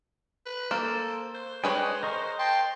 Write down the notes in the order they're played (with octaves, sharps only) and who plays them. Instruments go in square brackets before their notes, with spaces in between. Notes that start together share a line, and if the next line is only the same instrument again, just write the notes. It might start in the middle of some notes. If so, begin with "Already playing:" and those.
[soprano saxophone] B4
[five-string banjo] A#3 [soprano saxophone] A4 [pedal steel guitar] C5
[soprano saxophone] C5
[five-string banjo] G#3 B4 C#5 [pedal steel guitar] D4 D#5 G5
[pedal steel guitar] A#4 D#5 C#6
[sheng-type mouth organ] G5 C6 [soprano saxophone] A5